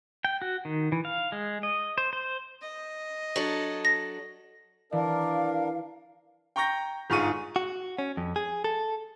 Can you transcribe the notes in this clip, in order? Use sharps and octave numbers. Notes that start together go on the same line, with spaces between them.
G5
F#4
D#3
E3
F5
G#3
D#5
C5
C5
D#5
F#3 D4 A4
A#6
E3 D4 A#4 D5 F5
G5 A#5 C#6 G6 A#6
G1 G#2 F4 G#4 C#6 D#7
F#4
C#4
F2
G#4
A4